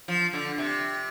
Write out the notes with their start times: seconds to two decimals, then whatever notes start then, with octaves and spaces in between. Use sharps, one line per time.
0.08 F3
0.33 D3
0.58 C3